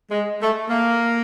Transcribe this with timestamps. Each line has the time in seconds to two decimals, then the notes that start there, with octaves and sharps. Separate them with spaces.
0.11 G#3
0.41 A3
0.70 A#3